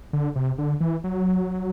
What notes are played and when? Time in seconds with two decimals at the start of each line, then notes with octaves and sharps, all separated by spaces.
0.13 D3
0.36 C3
0.58 D3
0.80 E3
1.04 F#3